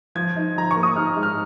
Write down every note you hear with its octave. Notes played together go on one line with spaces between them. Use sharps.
F3 G#6
D#4
F3 A#5
C#6
A#3
D#6
D#4 F6
G#2
F6